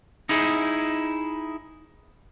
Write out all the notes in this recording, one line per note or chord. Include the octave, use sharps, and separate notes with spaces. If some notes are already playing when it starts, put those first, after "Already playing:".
D#4 E4 G#4